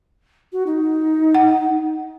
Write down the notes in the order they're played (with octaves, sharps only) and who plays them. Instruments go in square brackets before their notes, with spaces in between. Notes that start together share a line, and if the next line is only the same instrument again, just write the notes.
[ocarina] F#4
D#4
[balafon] F#5